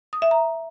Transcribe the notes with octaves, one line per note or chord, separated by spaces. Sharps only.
D#6
E5
A#5